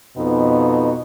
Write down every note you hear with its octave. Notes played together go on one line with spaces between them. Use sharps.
F2 B2 B3 D#4